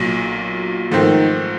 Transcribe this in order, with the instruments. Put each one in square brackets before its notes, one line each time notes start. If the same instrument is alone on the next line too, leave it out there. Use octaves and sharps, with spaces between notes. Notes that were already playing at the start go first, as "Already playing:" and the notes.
Already playing: [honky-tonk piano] B1 A#2 F#3
[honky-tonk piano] G#2 F3 A3 C4 [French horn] D#3